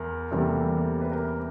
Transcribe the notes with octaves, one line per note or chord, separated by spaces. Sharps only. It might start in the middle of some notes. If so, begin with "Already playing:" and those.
Already playing: E2 A#4
E2 C3 E3 G3 A#3 A4
B4
A#4